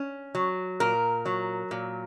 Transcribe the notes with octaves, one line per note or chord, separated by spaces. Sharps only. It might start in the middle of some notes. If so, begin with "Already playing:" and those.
Already playing: C#4
F#3
A#2 A#4
F#3
A#2